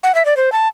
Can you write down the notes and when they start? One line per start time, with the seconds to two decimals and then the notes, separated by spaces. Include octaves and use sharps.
0.03 F#5
0.15 E5
0.25 D5
0.37 C5
0.52 A5